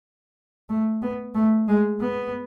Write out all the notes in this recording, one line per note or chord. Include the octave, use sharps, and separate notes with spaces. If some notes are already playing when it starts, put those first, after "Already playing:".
A3
B3
A3
G#3
B3